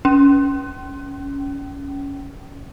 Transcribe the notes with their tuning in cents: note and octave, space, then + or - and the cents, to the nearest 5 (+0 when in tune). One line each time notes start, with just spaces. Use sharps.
C#4 +15